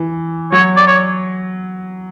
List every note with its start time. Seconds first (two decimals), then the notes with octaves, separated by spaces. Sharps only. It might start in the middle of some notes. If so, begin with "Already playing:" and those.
Already playing: E3
0.52 F#3 C#5
0.77 D5
0.87 C#5